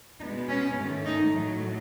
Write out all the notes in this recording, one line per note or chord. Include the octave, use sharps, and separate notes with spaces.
B2 G#3 B3 D#4
C#4
G#2 D#3 A3
D#4
A2 F#3 A3